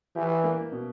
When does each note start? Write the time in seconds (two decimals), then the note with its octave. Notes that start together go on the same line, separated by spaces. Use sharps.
0.15 E3 G4
0.44 A#3
0.72 B2